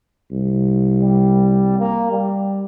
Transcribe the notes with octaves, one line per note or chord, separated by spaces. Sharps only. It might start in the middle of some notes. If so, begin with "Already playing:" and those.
C2
G3
A#3
G3